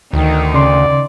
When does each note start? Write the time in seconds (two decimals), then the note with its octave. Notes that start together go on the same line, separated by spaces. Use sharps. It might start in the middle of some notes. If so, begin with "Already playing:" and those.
0.13 D2 D#3 D#4
0.54 C#3 D5 C6